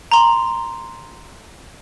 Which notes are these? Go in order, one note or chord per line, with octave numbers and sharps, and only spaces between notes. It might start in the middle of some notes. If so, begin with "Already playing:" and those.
A#5 C6